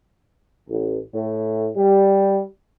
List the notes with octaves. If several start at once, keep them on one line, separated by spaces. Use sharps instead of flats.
A1
A2
G3